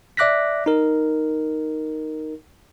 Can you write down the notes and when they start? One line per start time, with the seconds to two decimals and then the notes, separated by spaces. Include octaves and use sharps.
0.17 D5 E5 D6 F#6 A#6 B6
0.66 D#4 A#4